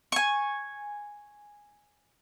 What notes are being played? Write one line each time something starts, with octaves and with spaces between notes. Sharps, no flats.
G#5 C#6